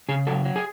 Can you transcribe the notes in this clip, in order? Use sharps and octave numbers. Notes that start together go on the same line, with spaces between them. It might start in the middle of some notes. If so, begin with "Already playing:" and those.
C#3 G#4
F#3 A4
F#3
G#4